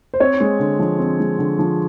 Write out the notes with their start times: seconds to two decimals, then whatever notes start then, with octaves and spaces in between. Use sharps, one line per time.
0.14 C5
0.20 C4 C#5
0.40 G#3
0.59 D3
0.79 F3
0.99 C4
1.20 G#3
1.39 D3
1.59 F3